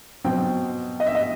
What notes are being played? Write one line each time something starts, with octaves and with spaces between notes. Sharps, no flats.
B2 F#3 C4 G5
D#5
E5
D#5